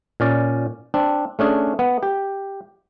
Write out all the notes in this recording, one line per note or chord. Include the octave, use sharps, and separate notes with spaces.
A#2 C#4 D5
C4 D4
A3 C#4 D4 G#4
B3
G4